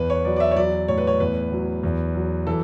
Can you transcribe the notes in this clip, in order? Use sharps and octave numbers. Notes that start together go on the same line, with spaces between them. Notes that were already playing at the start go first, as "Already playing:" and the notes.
Already playing: E2 B4
C#5
F#3 D5
D5
E5
C#5
F#3 D5
A2 C#5
B4
C#5
E2 B4
F#3
E2
F#3
E3 A4